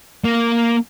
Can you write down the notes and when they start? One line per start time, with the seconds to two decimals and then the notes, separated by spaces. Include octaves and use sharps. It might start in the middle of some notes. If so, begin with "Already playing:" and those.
0.24 A#3